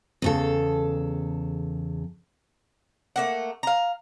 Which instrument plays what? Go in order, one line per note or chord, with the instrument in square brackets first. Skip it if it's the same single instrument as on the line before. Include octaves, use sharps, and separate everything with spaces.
[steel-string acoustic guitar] E2 C#3 A4
[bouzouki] A3 A#3 F#5
F5 A#5